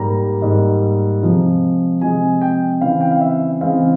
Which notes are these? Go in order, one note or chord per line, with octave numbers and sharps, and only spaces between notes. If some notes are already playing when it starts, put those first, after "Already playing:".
Already playing: G#2 G3 A#3 A#5
G#2 G3 A#3
C3 F3 G#3
C3 F3 G#3 G#5
G5
C#3 E3 G#3 C4 F5
G5
F5
E5
C#3 E3 G#3 C4 F5